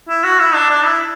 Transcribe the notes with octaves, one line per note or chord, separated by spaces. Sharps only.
E4
F#4
E4
D4
D4
E4